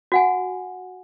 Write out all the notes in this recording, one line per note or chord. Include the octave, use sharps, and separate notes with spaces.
F#4 F#5 G#5